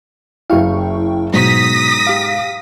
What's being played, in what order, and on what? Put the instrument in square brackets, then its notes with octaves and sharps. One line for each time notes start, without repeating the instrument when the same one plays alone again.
[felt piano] F#1 F5 [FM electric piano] E4 G5 C#6
[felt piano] G#2 [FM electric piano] B2 F#3 [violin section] D#6 A#6 B6
[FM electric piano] G4 F5